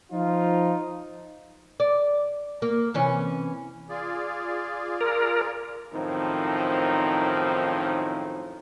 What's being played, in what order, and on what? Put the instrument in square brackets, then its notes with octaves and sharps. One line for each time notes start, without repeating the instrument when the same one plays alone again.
[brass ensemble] F3 F4 [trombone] D#4
[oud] D5
A#3
C3 E3 C#4
[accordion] F4 G#4 D5
[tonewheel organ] A#4
[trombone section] F#2 A2 D#3 F3 C4 D#4